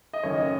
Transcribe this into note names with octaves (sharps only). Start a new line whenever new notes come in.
D#5
F#1 F#2 D#3 C#5
D#5